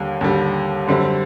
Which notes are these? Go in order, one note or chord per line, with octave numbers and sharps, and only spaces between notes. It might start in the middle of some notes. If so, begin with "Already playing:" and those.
Already playing: D#2 D3 G3
D#2 D3 G3
F#2 D3 G3 C4